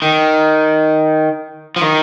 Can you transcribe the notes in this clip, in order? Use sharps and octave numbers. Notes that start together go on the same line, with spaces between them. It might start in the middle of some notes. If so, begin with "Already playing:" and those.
D#3
F3
D#3